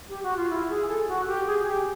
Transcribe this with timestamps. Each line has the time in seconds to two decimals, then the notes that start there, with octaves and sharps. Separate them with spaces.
0.09 G4
0.23 F#4
0.37 F4
0.50 E4
0.70 G#4
0.89 A4
1.08 F#4
1.27 G4
1.47 G#4
1.66 G4